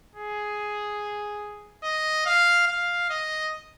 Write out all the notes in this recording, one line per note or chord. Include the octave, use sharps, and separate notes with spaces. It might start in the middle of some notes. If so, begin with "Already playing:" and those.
G#4
D#5
F5
F5
D#5